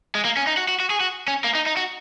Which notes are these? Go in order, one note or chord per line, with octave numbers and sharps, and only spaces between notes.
G#3
A#3
C#4
D#4
F#4
F#4
F#4
G#4
F#4
C#4
A#3
D#4
D#4
F#4